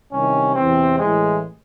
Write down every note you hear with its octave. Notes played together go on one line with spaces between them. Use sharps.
C2 C3 D#3 C#4
E2 C3 E3 C4
A1 A2 E3 G#3